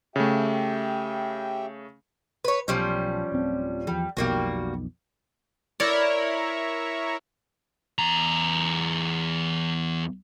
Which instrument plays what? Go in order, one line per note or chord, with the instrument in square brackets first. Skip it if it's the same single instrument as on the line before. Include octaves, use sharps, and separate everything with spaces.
[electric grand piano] C#3 A3 [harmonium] G4 E5 G5
[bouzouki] B4 C#5
[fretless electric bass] B1 [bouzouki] F3 G3 C#4
[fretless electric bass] D1 C4
[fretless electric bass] E2 F3 [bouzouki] G3
[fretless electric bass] B1 F2 B2 [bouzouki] G3 A#3 F#4
[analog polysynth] E4 A#4 C#5 [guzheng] D5
[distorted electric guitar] E2 A#5